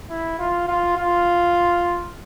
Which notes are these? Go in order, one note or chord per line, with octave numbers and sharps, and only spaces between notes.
E4
F4
F4
F4